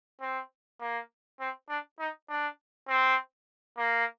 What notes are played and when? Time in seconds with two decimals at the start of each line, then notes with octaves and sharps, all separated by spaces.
0.21 C4
0.81 A#3
1.40 C4
1.69 D4
1.99 D#4
2.29 D4
2.88 C4
3.77 A#3